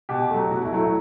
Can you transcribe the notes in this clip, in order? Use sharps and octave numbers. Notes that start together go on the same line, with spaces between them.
B2 G4
F#3 A3
B2 F#4
E4
F#3 A3
E4